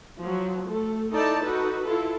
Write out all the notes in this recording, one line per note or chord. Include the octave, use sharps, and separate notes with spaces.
F3 F#3
A3 A4
D#4 E4 A4 D5 A5
D#4 F#4 A4 B4
E4 F4 A4